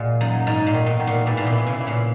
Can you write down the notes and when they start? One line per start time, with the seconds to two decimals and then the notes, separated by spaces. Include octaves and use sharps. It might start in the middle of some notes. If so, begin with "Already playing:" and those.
Already playing: A#2 G#3
0.21 F#2 D#4
0.47 G#2 D#4
0.67 A#2
0.74 D#3
0.86 B2
1.00 D#3
1.07 A#2
1.26 G#2 E3
1.37 A#2
1.47 B2
1.53 E3
1.67 C#3
1.80 E3
1.87 A#2